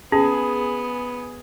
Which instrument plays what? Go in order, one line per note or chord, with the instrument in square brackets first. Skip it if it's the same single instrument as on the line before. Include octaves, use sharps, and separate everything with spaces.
[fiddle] B3 [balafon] C#4 [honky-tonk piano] G#4